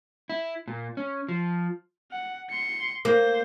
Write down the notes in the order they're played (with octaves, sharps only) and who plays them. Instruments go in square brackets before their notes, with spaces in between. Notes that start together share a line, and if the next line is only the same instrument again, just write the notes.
[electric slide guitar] E4
A#2
C#4
F3
[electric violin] F#5
C6 C#7
[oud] A#3 [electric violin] C5